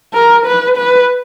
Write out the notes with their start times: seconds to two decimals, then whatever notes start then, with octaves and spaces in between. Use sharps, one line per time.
0.14 A#4
0.46 B4
0.77 B4